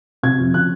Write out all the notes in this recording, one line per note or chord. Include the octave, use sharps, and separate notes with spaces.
C3 G#6
F2
C#3 F#6